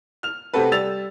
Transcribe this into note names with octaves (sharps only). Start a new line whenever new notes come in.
F6 F7
C3 A3 C4 F#4 A4 B4
G3 E6 A6 F7